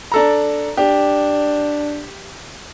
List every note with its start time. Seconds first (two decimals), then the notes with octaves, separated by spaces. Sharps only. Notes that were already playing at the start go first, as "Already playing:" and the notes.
0.12 D4 A4 A#5
0.77 D4 G4